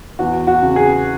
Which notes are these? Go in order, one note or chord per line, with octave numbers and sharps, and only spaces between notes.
E2 F#4
F#4
C#3
G#4